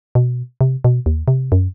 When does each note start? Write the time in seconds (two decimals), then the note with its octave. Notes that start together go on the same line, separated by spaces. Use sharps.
0.15 B2
0.61 C3
0.84 B2
1.06 D#2
1.28 C3
1.52 F#2